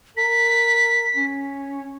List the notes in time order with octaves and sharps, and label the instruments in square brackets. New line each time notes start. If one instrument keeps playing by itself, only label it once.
[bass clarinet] A#4 [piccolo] B6
[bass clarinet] C#4